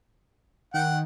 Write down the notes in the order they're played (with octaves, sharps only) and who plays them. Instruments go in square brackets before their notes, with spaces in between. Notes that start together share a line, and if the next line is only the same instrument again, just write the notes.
[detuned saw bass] D#3 [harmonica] F#5 G5